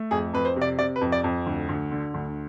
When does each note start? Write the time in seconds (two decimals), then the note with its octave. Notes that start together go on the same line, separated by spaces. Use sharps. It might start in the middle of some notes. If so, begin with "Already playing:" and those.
Already playing: A3
0.11 F2 G#4
0.33 F2 B4
0.45 C5
0.56 C3
0.61 D5
0.79 C3 D5
0.96 B4
1.01 F2
1.12 D5
1.24 F2
1.46 D2
1.69 D2
1.91 D3
2.14 D2